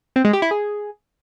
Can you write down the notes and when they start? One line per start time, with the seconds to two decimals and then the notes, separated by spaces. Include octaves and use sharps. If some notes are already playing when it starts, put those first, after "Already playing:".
0.16 C4
0.25 G#3
0.33 G4
0.42 E4
0.51 G#4